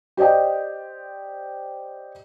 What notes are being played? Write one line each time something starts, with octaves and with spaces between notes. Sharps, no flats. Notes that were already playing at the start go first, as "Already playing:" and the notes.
G4 C5 D5 D#5 G5